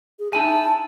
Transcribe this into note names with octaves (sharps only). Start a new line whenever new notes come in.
G#4
D#4 E4 G#5 A5